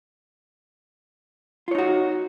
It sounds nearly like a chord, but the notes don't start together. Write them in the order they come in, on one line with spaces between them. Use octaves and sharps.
F4 C#5 D#4 F#4